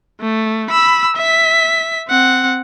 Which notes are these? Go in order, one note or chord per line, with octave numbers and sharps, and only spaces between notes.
A3
B5 E6
E5 B6
C4 F#5